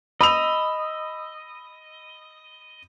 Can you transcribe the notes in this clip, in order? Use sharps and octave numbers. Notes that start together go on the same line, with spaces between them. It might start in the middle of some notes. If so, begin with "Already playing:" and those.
D#5 B5 E6 F7